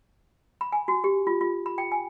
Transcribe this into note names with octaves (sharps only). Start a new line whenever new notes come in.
B5
G#5
F#4
G4
F4
F4
B5
G5
G#5